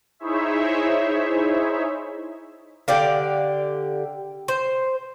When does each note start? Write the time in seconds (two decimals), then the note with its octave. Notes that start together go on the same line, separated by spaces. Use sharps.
0.19 D#4 E4 G#4 C5 C#5 E5
2.88 D3 G4 D5 F5
4.48 C5